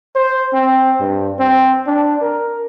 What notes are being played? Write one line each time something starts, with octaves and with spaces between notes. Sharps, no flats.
C5
C4
G2
C4
D4
A#4